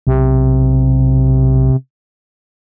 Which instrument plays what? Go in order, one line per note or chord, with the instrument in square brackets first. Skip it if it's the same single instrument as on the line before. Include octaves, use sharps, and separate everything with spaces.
[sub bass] B1 [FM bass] C3